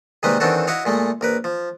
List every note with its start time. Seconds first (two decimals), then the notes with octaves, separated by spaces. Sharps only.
0.23 C3 D#3 G3 G#3 A#3 B4
0.40 D#3 E3 C4 D4 F#4 A4
0.67 E4 F#4 C#5 D#5 F5
0.85 A#2 G#3 A3
1.21 A#1 A#4 B4
1.44 F3